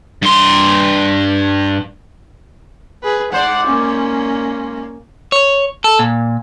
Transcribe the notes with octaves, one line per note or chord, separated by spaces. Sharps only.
G2 C6
G#4 B4
G#2 C5 D5 F#5
A#3 C#4
C#5
A4
A#2